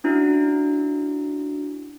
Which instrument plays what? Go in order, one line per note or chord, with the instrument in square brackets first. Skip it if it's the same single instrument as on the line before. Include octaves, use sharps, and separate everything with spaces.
[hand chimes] C#4 D4 E4 F#4